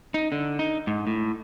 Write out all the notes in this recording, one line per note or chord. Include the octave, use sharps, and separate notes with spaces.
D#4
D3
D#4
G#2
A2